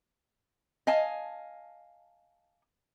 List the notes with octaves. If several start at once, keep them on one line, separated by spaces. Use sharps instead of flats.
D#5 F5 G#5 A5